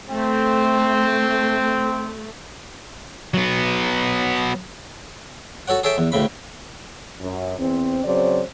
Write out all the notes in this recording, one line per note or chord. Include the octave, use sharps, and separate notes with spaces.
A3 C4
F#3 B3
F#4 A4 C#5 F#5
G#4 A4 C#5 E5 G5
E2
D2 A2 C#3 B5
F#2
E2 C4
C#3 F#3 C4 C5 D5